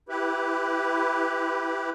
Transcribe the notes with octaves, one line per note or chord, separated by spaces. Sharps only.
E4 G4 B4